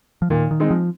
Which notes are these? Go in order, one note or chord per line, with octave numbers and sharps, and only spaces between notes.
F3
A#2 D#3
D#3
G#3 C4 D#4
F3